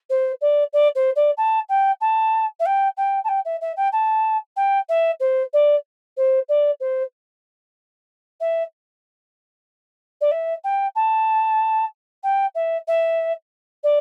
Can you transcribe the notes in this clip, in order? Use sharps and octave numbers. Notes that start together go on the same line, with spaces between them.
C5
D5
D5
C5
D5
A5
G5
A5
E5
G5
G5
A5
G5
E5
E5
G5
A5
G5
E5
C5
D5
C5
D5
C5
E5
D5
E5
G5
A5
G5
E5
E5
D5